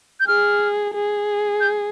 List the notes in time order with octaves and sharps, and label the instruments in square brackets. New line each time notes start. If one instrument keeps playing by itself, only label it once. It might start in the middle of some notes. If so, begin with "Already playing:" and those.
[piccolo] G6
[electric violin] G#4 [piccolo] F6
[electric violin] G#4
[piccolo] G6